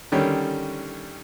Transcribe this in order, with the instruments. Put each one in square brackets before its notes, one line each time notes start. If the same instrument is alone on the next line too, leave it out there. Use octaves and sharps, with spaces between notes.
[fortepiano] D3 D#3 G3 C#4